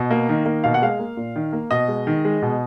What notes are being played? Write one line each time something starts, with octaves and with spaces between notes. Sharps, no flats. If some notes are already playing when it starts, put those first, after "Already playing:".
Already playing: B2 D#5
A#3
D#3
A#3
B2 F5
F#5
G#3 F5
A#3
A#2
D#3
A#3
B2 D#5
G#3
D#3
G#3
B2